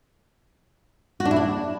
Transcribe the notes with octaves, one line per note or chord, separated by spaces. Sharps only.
F#4
D4
E4
D4